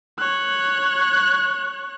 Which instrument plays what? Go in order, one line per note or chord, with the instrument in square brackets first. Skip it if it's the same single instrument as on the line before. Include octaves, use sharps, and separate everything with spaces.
[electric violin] C#5 F#6